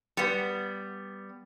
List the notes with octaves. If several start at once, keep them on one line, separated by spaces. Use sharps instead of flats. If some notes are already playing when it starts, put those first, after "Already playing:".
G3 B3